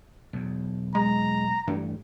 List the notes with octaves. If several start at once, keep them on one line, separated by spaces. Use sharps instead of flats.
B1 E2
G#3 A#5
G2 E3 A3